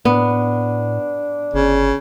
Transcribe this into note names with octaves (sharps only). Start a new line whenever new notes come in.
A2 B3 D4
G1 C#3